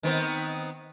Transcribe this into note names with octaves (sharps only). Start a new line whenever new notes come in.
D#3 B3 C4